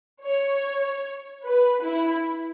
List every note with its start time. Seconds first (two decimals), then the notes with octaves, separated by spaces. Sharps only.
0.25 C#5
1.45 B4
1.84 E4